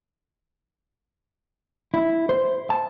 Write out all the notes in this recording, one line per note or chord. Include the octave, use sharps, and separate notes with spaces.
E4
C5
A5